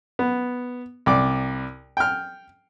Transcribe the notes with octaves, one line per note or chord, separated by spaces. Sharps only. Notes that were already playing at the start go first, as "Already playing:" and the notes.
B3
C2 D5 D6
G5 F6